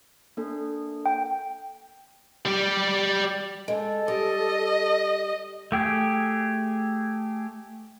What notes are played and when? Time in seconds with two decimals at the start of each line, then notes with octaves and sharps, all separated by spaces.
0.37 A#3 D4 A4
1.06 G5
2.46 G3 G4
3.68 G#3 A4
4.08 G3 D#5
5.72 A3 G4 G#4